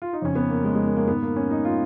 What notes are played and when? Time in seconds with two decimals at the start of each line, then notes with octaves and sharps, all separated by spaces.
0.02 F4
0.13 D#4
0.22 F2 C#3 C#4
0.36 B3
0.50 A#3
0.65 G#3
0.75 G#3
0.86 A#3
0.96 A#3
1.08 G#2 D#3 B3
1.23 A#3
1.36 C#4
1.51 D#4
1.65 F4